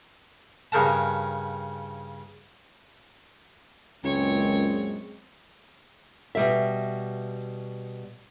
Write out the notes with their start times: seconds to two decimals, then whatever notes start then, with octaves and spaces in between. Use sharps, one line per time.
0.72 G2 C#3 A#4 F#5 A5
4.04 C#2 F#2 A#2 G#3 C4 C#5
6.35 B2 G3 E5